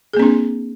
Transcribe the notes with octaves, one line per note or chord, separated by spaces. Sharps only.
A#3 C4 D4 G#4